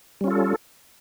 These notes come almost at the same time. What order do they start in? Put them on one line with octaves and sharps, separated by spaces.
G3 C#4 F4 A4